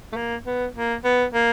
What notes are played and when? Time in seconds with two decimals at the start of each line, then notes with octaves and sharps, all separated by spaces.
0.12 A3
0.16 A#3
0.46 B3
0.75 A#3
1.04 B3
1.34 A#3